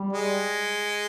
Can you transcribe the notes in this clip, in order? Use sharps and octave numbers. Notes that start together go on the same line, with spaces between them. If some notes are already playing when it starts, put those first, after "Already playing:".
Already playing: G3
G#3